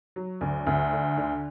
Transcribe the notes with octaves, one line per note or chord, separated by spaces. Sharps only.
F#3
D2
D2
D3
D3